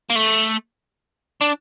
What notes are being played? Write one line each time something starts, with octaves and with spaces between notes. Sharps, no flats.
A#3
A3
D4